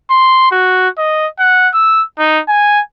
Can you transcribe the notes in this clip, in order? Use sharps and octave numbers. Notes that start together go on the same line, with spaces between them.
C6
F#4
D#5
F#5
E6
D#4
G#5